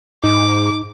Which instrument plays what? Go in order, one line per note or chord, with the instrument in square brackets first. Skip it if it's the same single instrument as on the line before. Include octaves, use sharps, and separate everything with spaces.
[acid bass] G#2 [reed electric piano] D#4 [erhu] D6